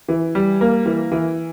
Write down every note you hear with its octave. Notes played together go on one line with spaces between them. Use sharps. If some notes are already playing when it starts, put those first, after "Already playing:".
E3
G3
A#3
E3
E3